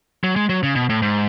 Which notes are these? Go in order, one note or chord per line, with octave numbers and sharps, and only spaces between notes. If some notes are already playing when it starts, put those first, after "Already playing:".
F#3
G#3
F#3
C#3
B2
A2
G#2